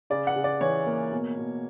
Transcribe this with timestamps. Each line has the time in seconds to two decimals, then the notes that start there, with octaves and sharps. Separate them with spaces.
0.10 C#3 D5
0.27 F#5
0.36 C#3
0.44 D5
0.61 E3 C#5
0.86 A#3
1.12 B2
1.38 B2